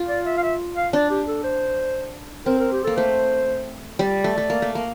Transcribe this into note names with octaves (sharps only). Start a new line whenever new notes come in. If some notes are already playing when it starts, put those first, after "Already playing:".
Already playing: F4
D5
E5
F5
E5
F5
D4 D5
G4
A4
C5
C4 A#4
A#4
G4
A#3 A4
A3 C5
G3 D5
A3
A3
A#3
A3
A#3